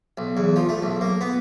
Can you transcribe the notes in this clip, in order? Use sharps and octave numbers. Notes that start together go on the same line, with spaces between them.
B1
E2
F3
A3
B1
A#3
B3